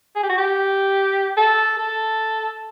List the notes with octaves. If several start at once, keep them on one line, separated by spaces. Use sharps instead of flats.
G#4
G4
F#4
G4
A4
A4